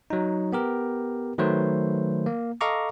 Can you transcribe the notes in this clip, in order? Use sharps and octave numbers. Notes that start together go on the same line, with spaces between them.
F#3 D#4
B3 G4 A#4
D#3 F#3 A3 B4 C5
A#3
A4 D#5 F5 A#5 C#6 D6